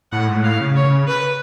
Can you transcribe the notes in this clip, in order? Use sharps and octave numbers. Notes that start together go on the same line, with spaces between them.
A2 F#5
G#2
A2
F5
C#3
C#5
C#3
B4